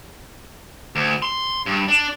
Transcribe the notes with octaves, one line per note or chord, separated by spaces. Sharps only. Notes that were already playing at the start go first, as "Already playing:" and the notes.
D2
C6
G2
D4